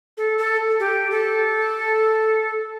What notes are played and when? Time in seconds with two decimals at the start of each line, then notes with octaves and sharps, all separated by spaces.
0.17 A4
0.38 A4
0.80 G4
1.11 A4